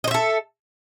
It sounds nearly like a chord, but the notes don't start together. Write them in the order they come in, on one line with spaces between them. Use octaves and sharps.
D#5 C5 E5 A4